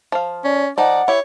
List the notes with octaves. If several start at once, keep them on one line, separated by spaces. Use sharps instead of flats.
F3 F5
C#4 D5
F3 D#4 D5 F#5
E4 G4 C#5